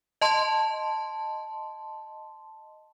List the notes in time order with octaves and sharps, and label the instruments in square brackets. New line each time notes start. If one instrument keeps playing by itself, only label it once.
[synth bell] D#5 A5 C6